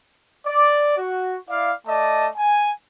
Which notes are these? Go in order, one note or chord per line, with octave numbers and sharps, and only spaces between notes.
D5
F#4
E4 D5 F5
A3 D5 D#5 A5
G#5